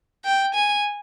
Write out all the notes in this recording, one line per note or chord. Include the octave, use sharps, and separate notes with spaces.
G5
G#5